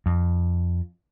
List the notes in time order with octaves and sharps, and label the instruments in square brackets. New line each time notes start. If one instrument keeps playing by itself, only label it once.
[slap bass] F2